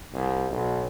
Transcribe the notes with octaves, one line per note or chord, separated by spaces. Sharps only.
C2
B1